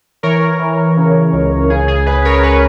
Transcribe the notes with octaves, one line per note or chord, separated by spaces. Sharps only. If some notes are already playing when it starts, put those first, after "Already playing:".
E3 A#4 C#5
E3
C#3
C#2
C#3 G#4
G#4
C#3 G#4 B4
A#4 C#5
G#4 B4